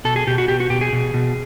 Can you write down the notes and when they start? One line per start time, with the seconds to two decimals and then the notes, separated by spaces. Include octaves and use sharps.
0.05 B2 A4
0.16 G#4
0.27 B2 G4
0.38 F#4
0.48 B2 G4
0.60 F#4
0.70 B2 G4
0.81 G#4
0.93 B2
1.14 B2